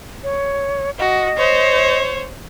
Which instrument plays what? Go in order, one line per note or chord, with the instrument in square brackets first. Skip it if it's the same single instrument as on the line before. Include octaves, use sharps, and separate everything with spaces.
[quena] C#5
[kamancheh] F#4 [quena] D#5
[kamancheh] C5 C#5